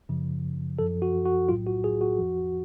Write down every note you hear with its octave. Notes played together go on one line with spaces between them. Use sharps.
F#2 C#3 F3
F#2 F3 A4
F#4
F#4
B1 A2 F#3 F4
F#4
G#4
F#4
F2 F3